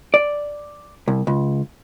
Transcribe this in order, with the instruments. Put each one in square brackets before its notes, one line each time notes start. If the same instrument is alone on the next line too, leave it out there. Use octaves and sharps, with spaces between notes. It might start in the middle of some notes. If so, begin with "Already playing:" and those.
[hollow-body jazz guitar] D5
C2
C#2